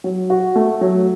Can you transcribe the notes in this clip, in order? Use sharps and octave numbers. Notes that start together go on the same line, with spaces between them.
F#3
F#4
A3
F#3